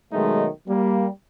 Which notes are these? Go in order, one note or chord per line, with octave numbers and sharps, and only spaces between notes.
B1 D#3 F#3 G#3 A3 D#4
G3 A#3